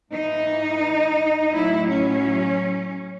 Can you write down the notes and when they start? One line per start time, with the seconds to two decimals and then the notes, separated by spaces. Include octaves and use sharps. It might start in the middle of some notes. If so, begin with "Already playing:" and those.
0.11 G#2 E3 D#4
1.52 A2 F#3 E4
1.88 C#4